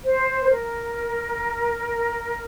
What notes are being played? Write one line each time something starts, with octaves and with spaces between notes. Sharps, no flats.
C5
B4
A#4